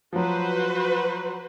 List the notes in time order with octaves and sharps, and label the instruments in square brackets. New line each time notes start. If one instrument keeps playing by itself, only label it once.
[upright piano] F3 F#3 [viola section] F#4 B4 C5